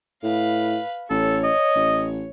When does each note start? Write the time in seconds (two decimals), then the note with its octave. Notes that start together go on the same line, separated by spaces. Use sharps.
0.23 A2 B4 F5
1.10 A1 A4 C#5
1.44 D#5
1.75 A1